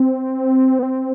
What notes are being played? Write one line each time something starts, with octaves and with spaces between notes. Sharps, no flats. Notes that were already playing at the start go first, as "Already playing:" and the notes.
Already playing: C4
B3
C4